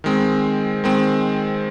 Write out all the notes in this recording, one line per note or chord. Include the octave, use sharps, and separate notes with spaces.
D#3 G#3 C4
D#3 G#3 C4